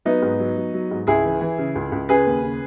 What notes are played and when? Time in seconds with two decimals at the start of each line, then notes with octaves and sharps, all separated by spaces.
0.05 F#3 B3 D#4
0.22 G#2
0.39 F#3
0.57 F#3
0.74 F#3
0.91 G#2
1.07 C#2 E4 G#4
1.24 E3
1.41 E3
1.58 C#3
1.75 C#2
1.92 C#2
2.09 C#3 G#4 B4
2.26 D#2
2.42 C#3